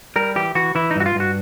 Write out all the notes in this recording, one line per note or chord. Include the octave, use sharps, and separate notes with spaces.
G3 A#4
E3 G4
E3 F#4
E3 E4
D#4
G2 F#4
F4
G2 F#4